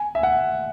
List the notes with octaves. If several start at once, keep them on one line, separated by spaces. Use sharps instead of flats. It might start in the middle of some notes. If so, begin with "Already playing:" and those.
Already playing: G#5
E5
F#5